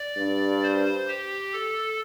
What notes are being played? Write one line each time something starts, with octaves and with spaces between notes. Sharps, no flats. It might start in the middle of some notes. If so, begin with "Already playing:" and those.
Already playing: D5
G2
C5
G4
A4